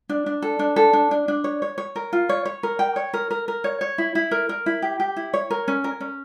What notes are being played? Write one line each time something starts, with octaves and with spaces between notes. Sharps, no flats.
D4
D4
A4
D4
A4
D4
D4
D4
C#5
C#5
C#5
A#4
F4
C#5
C#5
A#4
G5
C#5
A#4
A#4
A#4
C#5
C#5
E4
E4
A#4
A#4
E4
G4
G4
E4
C#5
A#4
C#4
A#4
C#4